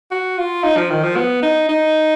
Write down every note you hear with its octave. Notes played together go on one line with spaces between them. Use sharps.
F#4
F4
D#4
F3
D#3
F3
B3
D#4
D#4